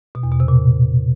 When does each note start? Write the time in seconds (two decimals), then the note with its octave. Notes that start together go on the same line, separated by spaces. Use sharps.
0.15 B2
0.23 E2
0.32 B2
0.40 C3
0.48 A#2